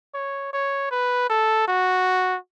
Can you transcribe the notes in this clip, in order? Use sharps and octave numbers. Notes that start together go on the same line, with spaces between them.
C#5
C#5
B4
A4
F#4